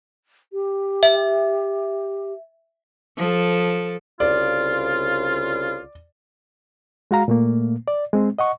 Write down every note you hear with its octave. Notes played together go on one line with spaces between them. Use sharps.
G4
E5
F3 A4
C2 C#3 F4 D5
G#3 F#4 F5 A#5
A#2 A3 A#3
D5
G#3 C4
D#5 F#5 C#6